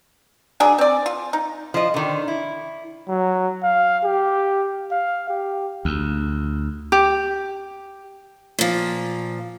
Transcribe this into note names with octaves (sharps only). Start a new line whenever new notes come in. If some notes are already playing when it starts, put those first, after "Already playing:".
F#3 G#3 D4 G#4
C4 D5
F4
D#4
F3 D#5
D3 D#3
E4
F#3
F5
G4
F5
G4
D2
G4
A#2 F3